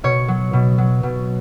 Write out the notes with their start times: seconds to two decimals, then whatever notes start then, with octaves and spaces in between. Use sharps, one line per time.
0.04 B2 C#5
0.28 F#3
0.53 B2
0.78 F#3
1.03 B2